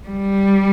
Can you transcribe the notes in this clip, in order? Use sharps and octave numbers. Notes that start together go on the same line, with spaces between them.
G3